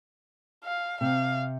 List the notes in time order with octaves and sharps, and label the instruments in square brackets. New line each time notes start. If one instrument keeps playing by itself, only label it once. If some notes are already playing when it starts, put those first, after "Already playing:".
[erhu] F5
[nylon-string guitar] C3 [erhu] F5